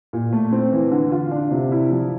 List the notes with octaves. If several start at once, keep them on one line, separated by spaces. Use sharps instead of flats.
A#2
A3
C4
E3
D3
F4
D4
C3
E4
F3